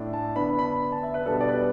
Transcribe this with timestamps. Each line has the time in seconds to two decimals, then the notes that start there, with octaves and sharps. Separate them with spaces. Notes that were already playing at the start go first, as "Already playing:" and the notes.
Already playing: A2 A3 D4
0.13 A5
0.36 D3 B3 D4 B5
0.59 B5
0.92 A5
1.03 E5
1.14 B4
1.25 B2 G3 B3 D4 A4
1.41 D5
1.48 B4